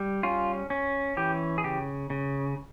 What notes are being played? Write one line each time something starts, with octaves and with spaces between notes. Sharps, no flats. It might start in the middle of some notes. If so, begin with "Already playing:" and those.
Already playing: G3
C#4 F4
C#4
E3 G4
G#4
C#3 G4
C#3